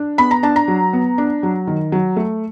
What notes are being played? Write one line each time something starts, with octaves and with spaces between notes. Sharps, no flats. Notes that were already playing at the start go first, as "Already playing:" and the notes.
Already playing: D4
B3 B5
A#5
D4 A5
A#5
F#3
B3
D4
F#3
D#3
F#3
A3